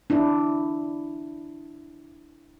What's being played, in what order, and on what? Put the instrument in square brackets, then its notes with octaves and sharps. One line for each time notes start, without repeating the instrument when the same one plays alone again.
[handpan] D4 E4